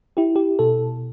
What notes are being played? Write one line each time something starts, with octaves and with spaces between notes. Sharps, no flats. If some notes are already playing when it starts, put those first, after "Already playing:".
E4 G4
G4
B2 A4